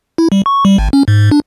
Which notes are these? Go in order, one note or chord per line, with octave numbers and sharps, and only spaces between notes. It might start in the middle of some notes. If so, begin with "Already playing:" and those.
E4
G3
C#6
G3
G#1
C#4
G#2
D4